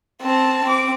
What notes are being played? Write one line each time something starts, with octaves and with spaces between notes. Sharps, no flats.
C4 A5
C4 D6